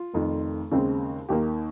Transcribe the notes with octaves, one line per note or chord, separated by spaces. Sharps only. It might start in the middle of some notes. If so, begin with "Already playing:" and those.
Already playing: F4
F1 F2 D#3
D#2 C#3 G#3 C4
D#2 D#3 A#3 G4